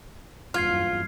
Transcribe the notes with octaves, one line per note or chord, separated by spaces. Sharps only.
F#1 E2 G2 F4 F6 G#6 C7